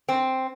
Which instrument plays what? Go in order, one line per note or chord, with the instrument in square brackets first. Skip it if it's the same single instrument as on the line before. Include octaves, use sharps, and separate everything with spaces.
[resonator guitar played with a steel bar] C4